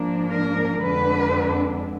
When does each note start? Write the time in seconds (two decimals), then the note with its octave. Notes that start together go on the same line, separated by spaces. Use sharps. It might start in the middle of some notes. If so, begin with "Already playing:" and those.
Already playing: G#2 F3 A#3 D4
0.31 A#4
0.82 F2 D3 G#3 D4 B4